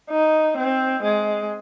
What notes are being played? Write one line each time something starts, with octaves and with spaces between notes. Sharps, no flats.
D#4
C4
G#3